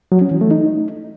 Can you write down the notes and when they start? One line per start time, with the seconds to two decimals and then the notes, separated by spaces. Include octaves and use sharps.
0.12 F#3
0.22 C#4
0.31 E3
0.41 A3
0.51 D#4